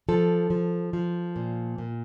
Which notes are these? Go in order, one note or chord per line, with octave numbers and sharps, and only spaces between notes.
F3 A4
F3
F3
A#2
A#2